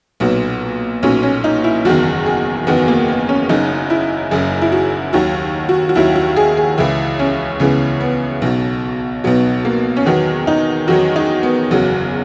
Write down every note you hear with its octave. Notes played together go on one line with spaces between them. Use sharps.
B1 A#2 F#3 B3
B1 A#2 F#3 C#4
C#4
D#4
E4
F#1 E2 D#3 F#4
G#4
F#1 E2 D#3 B3
A#3
B3
C#4
F#1 F#2 C#3 D#4
E4
F#1 F#2 C#3 G#4
E4
F#4
D#2 D#3 F#3 F#4
F#4
F#4
D#2 D#3 F#3 E4
F#4
G#4
G#4
C#2 C#3 E3 E4
C#4
C#2 C#3 E3 B3
B3
B1 B2 F#3
B1 B2 F#3 B3
A#3
C#4
E2 D#3 F#3 B3
D#4
E2 D#3 F#3 F#4
D#4
B3
F#1 E2 C#3 F#3